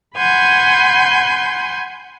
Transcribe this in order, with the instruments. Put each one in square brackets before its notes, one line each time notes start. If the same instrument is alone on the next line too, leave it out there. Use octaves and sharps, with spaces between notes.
[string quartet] F#5 G#5 B5 C6 G6